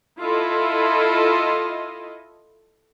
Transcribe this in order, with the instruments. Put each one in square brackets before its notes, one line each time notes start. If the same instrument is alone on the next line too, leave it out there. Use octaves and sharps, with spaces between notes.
[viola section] E4 F4 A4 D#5